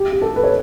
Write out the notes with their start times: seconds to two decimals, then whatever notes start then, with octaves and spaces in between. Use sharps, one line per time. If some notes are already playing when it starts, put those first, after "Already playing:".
Already playing: G4
0.12 G4
0.22 A4
0.36 B4
0.44 C#5